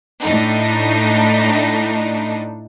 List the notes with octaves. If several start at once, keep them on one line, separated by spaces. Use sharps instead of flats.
A2 D4 D#4